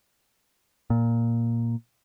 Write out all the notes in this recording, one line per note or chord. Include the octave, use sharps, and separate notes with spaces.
A#2